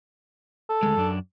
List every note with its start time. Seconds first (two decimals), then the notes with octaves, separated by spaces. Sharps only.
0.69 A4
0.83 D2 G#3
0.97 F#2 D4